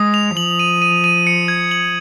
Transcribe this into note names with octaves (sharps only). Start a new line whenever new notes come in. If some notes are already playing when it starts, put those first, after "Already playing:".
Already playing: G#3 D#6
F7
F3 F#7
D#7
D#7
D#7
C#7
G#6
F#7